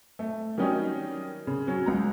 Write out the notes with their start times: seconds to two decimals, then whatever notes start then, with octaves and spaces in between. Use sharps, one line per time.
0.19 A3
0.58 D#3 F#3 G3 C#4 D#4 G4
1.47 C#3
1.67 F#3 C#4
1.86 C#2 A#5